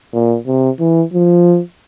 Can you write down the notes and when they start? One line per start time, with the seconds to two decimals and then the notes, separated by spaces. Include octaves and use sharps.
0.14 A#2
0.47 C3
0.80 E3
1.14 F3